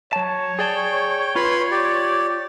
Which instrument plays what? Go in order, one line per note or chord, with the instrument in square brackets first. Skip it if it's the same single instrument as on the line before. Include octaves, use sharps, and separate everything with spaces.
[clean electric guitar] F#3 A5 [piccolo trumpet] C#5
[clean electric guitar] G#4 D5 A5 [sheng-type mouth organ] G5
[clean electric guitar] F4 [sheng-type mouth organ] B4 B5 C6
[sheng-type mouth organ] G4 D5